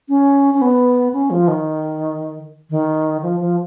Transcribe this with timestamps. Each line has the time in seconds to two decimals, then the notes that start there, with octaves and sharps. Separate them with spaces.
0.09 C#4
0.54 C#4
0.62 B3
1.13 C#4
1.30 F3
1.48 D#3
2.70 D#3
3.22 F3
3.40 F3